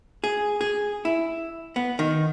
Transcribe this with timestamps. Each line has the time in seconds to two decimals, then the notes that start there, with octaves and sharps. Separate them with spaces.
0.24 G#4
0.61 G#4
1.05 E4
1.76 B3
1.99 D#3